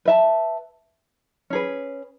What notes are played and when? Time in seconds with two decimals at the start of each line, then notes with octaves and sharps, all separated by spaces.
0.05 B4 E5 A5
1.50 C#4 G#4 B4